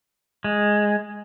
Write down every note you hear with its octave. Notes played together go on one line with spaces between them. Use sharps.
G#3